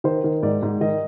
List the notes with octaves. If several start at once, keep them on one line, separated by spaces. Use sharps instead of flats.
D#3 C5
D#3
G#2 D5
G#2
D#3 D#5